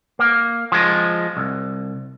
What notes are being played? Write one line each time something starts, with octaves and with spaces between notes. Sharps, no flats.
A#3
F3 G#3
C2